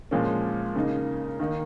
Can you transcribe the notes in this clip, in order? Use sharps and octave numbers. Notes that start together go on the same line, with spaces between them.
A#2 F3 G#3 C#4
C#3 A#3 D#4
D#3 A#3 D#4